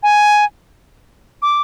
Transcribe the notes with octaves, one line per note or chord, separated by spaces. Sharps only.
G#5
D6